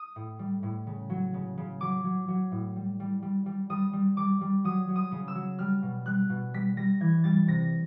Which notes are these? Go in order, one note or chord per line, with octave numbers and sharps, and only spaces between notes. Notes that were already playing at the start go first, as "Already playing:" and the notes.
Already playing: D#6
A2
G3
A2
C#3
F#3
C#3
C#3
F#3 D6
F#3
F#3
A2
G3
G3
G3
G3
G3 D#6
G3
G3 D6
G3
F#3 D#6
F#3
D#6
C#3
E6
F#3
G3 F6
B2
G3 F#6
B2
G3 B6
G3 A#6
E3 G#6
G3 A6
C3 A#6